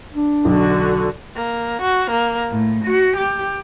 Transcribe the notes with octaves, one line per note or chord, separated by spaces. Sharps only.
D4
B1 D3 F#4
A#3
F#4
A#3
A2
F#4
G4